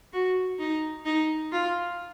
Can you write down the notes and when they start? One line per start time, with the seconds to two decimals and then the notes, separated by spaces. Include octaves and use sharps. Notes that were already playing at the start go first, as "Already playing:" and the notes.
0.13 F#4
0.59 D#4
1.05 D#4
1.52 F4